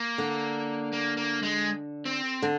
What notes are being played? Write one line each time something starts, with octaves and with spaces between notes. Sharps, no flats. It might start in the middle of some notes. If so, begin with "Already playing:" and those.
Already playing: A#3
D3
A#3
A#3
G#3
C4
D3